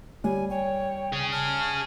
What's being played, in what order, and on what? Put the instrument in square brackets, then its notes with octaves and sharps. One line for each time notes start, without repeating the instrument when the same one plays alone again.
[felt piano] G3 [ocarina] C#5 [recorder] G#5
[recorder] C#5 [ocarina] G5
[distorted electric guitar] G#4 C#5
[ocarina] A5 [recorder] F6